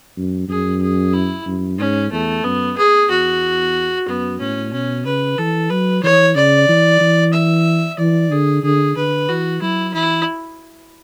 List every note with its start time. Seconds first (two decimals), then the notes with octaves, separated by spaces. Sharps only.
0.17 F#2
0.48 F#2 G#4
0.82 G#4
1.14 E4
1.46 F#2
1.79 G#2 C#4
2.12 E2 A3
2.44 F#2 B3
2.77 G#4
3.10 E2 F#4
4.07 F#2 B3
4.40 A2 C#4
4.73 B2 C#4
5.05 C#3 B4
5.38 E3 A4
5.70 F#3 B4
6.03 E3 C#5
6.35 C#3 D5
6.69 E3
7.01 E3
7.33 E5
7.99 E3 D5
8.31 D3 G#4
8.64 D3 G#4
8.97 D3 B4
9.29 E3 F#4
9.62 F#3 E4
9.94 E3 E4